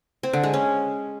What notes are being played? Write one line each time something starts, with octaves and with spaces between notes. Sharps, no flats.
C4
D3
G#3
C#4